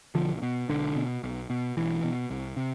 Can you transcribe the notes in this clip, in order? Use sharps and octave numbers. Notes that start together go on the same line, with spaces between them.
B1 D3 F3
B2
B1 D3
B2
B1
B2
B1 E3
B2
C2
C3